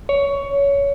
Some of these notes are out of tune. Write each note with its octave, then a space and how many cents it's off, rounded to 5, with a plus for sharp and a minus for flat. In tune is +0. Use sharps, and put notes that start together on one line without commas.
C#5 +15